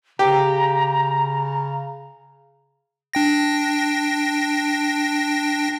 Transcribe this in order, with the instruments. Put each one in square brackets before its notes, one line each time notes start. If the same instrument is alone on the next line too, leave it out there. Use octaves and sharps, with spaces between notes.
[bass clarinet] C#3 [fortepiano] G4 [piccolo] A#5
[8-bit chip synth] D4 G5 A#6